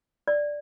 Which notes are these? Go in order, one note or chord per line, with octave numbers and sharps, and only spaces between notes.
D5